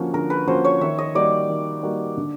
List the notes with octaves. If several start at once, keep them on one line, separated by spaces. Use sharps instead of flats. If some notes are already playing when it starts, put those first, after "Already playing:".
Already playing: D3 F3 A#3 C#4 F#4
D3 A#4
B4
F3 A#3 C#4 F#4 C5
C#5
D#3 E5
D#5
G3 A#3 D#4 F#4 D5
D#3
G3 A#3 D#4 F#4
D3